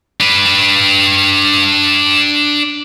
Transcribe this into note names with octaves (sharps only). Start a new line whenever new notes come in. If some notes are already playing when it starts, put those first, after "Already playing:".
D4 B4